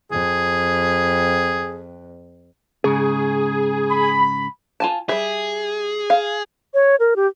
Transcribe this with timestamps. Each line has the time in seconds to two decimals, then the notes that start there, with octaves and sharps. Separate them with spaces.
0.12 F2 G#4
2.84 G#2 C#3 G#4
3.90 B5
4.80 F4 G#5 A5
5.09 G3 G#4 E5
6.10 F5
6.74 C#5
7.00 A#4
7.16 G4